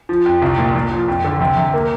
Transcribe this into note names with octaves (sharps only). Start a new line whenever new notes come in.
F3
F2
C2
A#2
A#2
F3
F2
D3
C3
C3
A#3